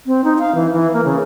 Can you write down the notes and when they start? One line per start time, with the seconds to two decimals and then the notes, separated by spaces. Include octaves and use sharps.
0.07 C4
0.24 D#4
0.39 F5
0.55 E3
0.73 E3
0.93 A#3
1.05 C#3